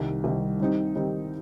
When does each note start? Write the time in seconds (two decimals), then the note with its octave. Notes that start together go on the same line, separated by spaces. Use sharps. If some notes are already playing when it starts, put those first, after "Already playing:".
Already playing: C2 C3 D#3
0.24 C2 C3 D#3
0.60 D#3 G3 C4 D#4
0.95 D#3 G3 C4 D#4